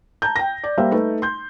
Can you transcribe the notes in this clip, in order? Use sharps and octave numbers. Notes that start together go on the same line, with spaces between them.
A5 A#5 G6
G5 A#6
D5
G3 A#3 C5 E5 F5
A3 D#4 B4
C6 G6